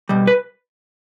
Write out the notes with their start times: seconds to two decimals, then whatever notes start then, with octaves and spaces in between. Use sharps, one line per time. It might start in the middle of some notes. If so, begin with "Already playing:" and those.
0.09 B2 G3
0.27 B4